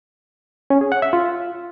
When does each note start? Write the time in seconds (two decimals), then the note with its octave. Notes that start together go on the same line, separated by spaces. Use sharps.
0.70 C#4
0.81 G#4
0.92 F#5
1.02 E5
1.13 F4